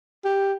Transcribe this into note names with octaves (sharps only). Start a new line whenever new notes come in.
G4